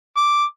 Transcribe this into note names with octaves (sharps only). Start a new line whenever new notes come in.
D6